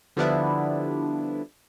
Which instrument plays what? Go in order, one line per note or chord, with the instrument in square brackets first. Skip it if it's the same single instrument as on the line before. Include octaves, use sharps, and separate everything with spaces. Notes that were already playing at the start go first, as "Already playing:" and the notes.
[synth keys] D3 F3 G3 B3 D4 E4